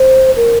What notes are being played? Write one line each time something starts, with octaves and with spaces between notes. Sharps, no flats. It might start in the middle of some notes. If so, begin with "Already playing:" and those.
Already playing: C5
A#4